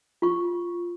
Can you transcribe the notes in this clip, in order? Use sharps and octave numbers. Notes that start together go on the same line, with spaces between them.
F4 C#6